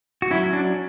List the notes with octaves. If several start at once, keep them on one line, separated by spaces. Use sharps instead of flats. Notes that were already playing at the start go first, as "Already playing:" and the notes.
F#4
F#3 C#4 E4
D4